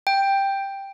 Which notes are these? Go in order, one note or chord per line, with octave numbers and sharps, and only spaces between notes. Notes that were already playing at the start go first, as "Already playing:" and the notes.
G5